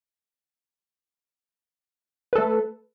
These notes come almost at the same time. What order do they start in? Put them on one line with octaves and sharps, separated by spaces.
B4 A4 A3